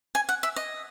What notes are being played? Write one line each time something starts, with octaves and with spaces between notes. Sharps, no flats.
G#5
F#5
E5
D#5